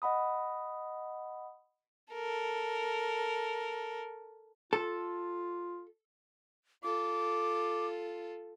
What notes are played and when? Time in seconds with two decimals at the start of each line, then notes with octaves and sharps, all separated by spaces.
0.02 D#5 F#5 B5 D#6
2.13 A4 A#4
4.73 F4 A4
6.83 F4 A4 D6